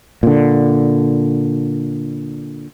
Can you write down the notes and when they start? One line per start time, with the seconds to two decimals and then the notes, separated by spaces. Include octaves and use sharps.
0.23 A#2 D3